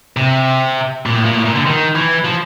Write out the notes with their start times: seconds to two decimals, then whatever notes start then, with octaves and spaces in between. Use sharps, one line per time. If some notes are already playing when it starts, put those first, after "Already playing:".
0.17 C3
1.06 A#2
1.16 A2
1.25 A#2
1.35 A2
1.45 A#2
1.55 D3
1.66 D#3
1.95 E3
2.24 F3